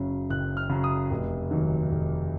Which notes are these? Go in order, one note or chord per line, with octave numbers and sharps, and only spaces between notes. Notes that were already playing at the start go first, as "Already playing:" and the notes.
Already playing: F#1 F#2 C#3
F#1 F#6
F6
F#2 C#3
D#6
F1
D#2 D#3 F#3
F1